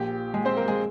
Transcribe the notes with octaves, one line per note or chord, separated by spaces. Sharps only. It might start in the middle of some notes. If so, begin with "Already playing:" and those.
Already playing: A#1 A#2 F3 G4
G#3 G#4
C4 C5
A#3 A#4
G#3 G#4